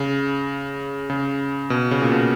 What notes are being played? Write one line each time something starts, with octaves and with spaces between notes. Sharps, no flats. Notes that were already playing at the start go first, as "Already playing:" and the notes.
Already playing: C#3
C#3
B2
C#3
A#2
B2